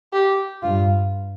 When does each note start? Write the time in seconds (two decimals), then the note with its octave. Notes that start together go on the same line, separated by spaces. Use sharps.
0.13 G4
0.63 G2 F4